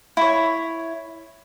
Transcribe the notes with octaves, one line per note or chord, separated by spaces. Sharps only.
E4 C#5